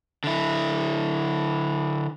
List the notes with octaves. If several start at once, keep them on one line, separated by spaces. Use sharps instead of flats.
D3 E4